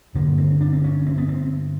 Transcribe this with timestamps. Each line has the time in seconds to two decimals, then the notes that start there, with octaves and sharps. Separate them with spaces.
0.15 G2 D3 A#3
0.38 C4
0.61 D4
0.73 C4
0.84 C#4
1.06 C4
1.18 B3
1.29 C4